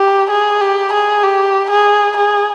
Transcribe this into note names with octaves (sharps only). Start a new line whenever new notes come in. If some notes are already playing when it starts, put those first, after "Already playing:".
Already playing: G4
G#4
G4
G#4
G4
G#4
G#4